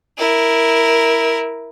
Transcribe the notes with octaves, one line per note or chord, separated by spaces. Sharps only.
E4 A#4